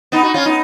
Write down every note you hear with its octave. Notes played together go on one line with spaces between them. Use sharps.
B3 D#4
D#4 F#4
C#4 F4
B3 D#4